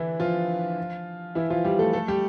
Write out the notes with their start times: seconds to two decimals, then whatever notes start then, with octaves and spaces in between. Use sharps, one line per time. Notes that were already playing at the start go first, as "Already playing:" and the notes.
Already playing: D3 E3 D4 E4
0.20 F3 F4
1.35 E3 E4
1.50 F3 F4
1.65 G3 G4
1.79 A3 A4
1.93 A3 A4
2.08 G3 G4